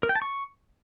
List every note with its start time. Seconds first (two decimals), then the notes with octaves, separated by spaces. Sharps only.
0.03 A#4
0.09 G5
0.15 A5
0.22 C#6